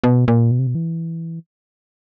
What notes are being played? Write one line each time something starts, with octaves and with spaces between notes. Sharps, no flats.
B2
A#2
B2
C3
B2
E3